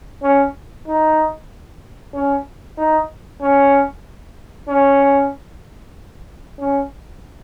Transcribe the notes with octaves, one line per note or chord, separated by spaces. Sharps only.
C#4
D#4
C#4
D#4
C#4
C#4
C#4